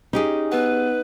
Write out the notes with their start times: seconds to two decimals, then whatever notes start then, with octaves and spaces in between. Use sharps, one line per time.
0.13 C#4 D#4 G4 G#4
0.52 B3 B4 F#5